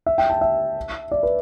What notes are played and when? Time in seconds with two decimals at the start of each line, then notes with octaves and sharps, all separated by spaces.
0.06 E5
0.18 G5
0.30 A5
0.41 E5
1.12 D5
1.23 B4